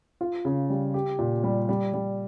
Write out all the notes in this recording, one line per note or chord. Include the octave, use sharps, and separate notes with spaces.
F4
C#3
G3
G4
A#2
G3
G3
G3